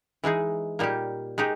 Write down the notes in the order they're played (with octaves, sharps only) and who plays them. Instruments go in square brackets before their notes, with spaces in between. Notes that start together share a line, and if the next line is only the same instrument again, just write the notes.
[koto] E3 G#3 D#4 G#4
A#2 G3 A#3 D#4 G4
G#3 D#4 G4